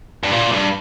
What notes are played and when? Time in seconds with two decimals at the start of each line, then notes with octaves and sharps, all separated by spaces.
0.23 G2
0.31 A#2
0.52 G2